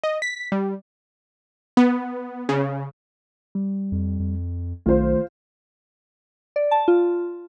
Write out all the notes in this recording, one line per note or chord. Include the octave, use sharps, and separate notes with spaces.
D#5
B6
G3
B3
C#3
G3
F2
F2
B1 D#3 A3 F4 C5
D5
A5
F4